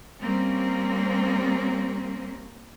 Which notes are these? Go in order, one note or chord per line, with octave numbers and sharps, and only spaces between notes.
G3 A#3 C4 C#4